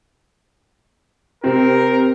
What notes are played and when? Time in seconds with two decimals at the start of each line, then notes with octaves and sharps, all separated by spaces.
1.44 C3 C4 A#4